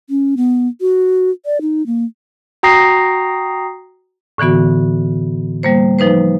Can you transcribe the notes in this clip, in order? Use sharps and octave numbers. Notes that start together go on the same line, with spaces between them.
C#4
B3
F#4
D5
D#4
A#3
F#4 G5 A#5 D#6 A#6 C7
A2 D3 E3 B3 F#4
G3 A#3 C5
F3 D#4 B4 C5